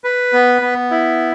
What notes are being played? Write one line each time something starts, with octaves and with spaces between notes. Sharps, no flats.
B4
B3
B3
E4